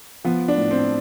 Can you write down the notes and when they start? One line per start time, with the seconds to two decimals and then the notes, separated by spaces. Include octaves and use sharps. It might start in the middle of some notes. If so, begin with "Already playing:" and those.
0.24 F3 B3
0.48 D4
0.56 A2
0.71 C4